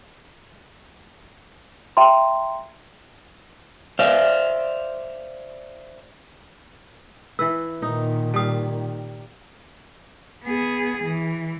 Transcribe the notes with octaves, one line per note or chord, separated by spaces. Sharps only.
E5 G5 A#5 C6
C5 D5 E5 F5
E3 B4 E6
A#2 D#3 D#4
G3 F5 A5 D#6
B3 G#4
E3